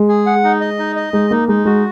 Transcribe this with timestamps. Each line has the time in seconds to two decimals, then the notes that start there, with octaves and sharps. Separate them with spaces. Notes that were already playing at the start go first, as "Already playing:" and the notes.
Already playing: G#3
0.09 G#4
0.26 F#5
0.44 D#4
0.61 D#5
0.79 D#4
0.96 D#5
1.13 G#3 D#4
1.31 A#3 D#4
1.48 G#3 D#4
1.65 G#3 F#4